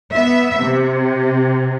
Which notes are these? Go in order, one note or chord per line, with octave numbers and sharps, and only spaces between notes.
B3 E5
C3